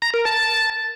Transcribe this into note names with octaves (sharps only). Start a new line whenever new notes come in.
A#5
A#4
A5